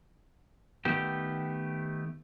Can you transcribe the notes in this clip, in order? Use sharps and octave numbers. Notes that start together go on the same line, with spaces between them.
D#3 A3 B3 G4